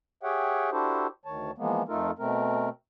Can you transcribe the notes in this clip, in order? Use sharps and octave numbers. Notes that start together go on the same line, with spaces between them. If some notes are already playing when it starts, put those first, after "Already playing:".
G4 G#4 C#5 E5 F#5 G5
D4 E4 F#4 G4 A4 C5
D2 D#3 C#5 A5
E3 F3 G#3 A#3 B3
F2 A3 D#4 F4 A4 A#4
B2 A3 C4 A#4